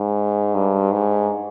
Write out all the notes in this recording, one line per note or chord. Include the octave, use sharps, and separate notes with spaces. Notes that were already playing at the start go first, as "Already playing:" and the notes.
Already playing: G#2
G2
G#2